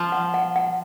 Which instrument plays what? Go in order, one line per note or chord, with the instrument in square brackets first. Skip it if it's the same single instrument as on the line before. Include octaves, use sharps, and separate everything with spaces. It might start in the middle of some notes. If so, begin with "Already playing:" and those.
Already playing: [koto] F3
[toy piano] F#5
F#5
F#5